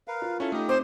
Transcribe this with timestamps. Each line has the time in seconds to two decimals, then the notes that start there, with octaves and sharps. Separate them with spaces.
0.08 A#4 B4 F5
0.22 F4
0.40 C#4 E4 A4 C#6
0.52 A3 D#4 G4 D#6
0.69 C4 C5 D6